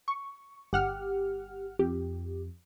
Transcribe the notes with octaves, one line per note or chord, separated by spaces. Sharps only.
C#6
G1 G4 F#5 F6
F2 G4